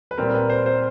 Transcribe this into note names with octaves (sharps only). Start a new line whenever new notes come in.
B4
A#2 G3 C4 A#4
A#4
B4
C5
C5